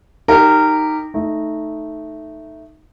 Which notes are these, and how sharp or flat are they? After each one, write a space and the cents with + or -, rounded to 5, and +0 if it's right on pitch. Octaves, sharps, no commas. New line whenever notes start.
D#4 +0 G4 +0 A#4 -15
A3 +0 D#4 +0